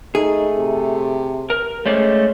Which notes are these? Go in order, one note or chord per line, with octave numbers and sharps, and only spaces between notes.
A3 D#4 G#4
C3
A#4
G#3 A3 C#4 C5 D5